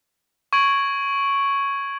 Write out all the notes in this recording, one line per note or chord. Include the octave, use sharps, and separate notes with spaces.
C#6 G#6 D7 F#7